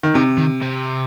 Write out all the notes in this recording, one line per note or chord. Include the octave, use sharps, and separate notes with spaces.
D#3
C3 D#3
D#3
C3